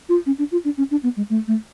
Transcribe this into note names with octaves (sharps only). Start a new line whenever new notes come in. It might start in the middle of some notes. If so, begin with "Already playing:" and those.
F4
C#4
D4
F4
D4
C#4
D4
B3
G#3
A3
A3